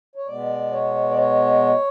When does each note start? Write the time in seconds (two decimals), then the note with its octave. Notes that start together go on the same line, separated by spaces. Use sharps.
0.15 C#5
0.27 B2 G#3 B3 D5
0.72 C#5
1.10 D5
1.17 C#5